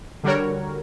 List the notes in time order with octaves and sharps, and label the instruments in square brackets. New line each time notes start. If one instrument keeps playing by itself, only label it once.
[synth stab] D3 G3 F#4 A#4 C#5